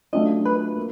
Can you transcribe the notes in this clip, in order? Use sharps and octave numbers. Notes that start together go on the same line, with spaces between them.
F#3 A3 D4 F4 D#5
B4
A#3